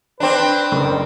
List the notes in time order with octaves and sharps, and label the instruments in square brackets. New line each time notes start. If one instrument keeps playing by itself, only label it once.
[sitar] C4 D4 [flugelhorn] B4
[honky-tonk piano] F#1